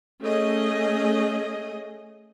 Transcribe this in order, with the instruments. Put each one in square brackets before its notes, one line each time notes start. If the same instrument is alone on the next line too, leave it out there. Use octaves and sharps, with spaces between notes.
[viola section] A3 C#4 G#4 D#5